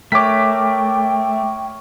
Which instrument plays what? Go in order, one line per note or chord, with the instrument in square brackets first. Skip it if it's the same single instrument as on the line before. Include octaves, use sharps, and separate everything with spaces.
[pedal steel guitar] A3 [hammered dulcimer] A#4 C#5 [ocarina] G5 [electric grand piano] D6 B6